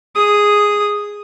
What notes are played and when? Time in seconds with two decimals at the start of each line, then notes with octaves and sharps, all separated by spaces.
0.16 G#4 D#6